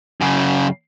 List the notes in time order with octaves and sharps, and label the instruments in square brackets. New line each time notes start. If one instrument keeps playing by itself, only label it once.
[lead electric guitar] F#2 C#3